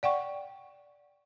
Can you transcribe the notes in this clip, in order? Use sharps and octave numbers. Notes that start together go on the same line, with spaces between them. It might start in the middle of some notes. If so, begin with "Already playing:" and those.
D5 F#5 G5 C#6